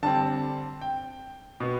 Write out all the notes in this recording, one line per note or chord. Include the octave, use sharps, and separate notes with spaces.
D3 G3 C4 A5
G5
B2 B3